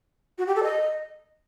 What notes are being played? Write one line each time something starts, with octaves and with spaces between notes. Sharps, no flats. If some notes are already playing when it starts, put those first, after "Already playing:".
F#4
G4
A4
D#5